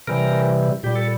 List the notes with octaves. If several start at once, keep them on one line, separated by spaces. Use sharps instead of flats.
C3 E3 G3 A#4
A#2 G3 G4
A4